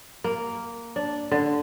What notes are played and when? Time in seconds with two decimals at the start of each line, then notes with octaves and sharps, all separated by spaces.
0.24 A#3
0.96 D4
1.32 D3